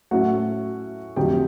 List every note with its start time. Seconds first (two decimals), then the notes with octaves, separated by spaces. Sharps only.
0.11 A2 F#3 A3 C#4 F#4 F#5
1.16 F2 D3 F#3 A3 G4 G5